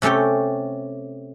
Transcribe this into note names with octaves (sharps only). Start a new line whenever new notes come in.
C3 A3 C#4 G4 G5